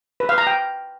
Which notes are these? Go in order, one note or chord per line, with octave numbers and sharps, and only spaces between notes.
B4
F5
A#5
G5